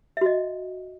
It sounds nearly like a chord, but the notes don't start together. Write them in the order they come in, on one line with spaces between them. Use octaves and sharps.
E5 F#4 D#5